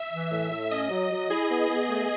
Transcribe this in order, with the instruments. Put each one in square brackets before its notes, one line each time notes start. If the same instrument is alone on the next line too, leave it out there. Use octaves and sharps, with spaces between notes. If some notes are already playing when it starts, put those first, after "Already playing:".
Already playing: [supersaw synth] E5
[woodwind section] E3
A2
A2
[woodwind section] C#4 [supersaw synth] D#5
[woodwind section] F#3
F#3
[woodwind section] E4 [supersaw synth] G#4
[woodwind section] B3
B3
A3